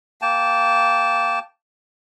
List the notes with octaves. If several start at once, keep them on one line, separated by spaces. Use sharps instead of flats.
A#3 G5 A5